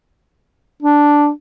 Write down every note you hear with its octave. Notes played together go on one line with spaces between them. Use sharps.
D4